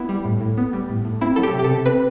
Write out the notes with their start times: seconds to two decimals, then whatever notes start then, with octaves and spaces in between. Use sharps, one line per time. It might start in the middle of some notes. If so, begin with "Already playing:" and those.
Already playing: B3 E4
0.09 G3
0.25 A2
0.41 A2
0.57 B3
0.73 G3
0.89 A2
1.05 A2
1.21 C4 E4
1.36 F#3 A4
1.43 G4
1.53 C3
1.59 G4
1.64 A4
1.70 C3
1.86 C4 B4